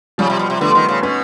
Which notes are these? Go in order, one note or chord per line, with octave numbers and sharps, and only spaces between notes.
C#3 F3 G3
C3
B2
C3
D3 A3 B3
D#3
C#3
B2 B3 C#4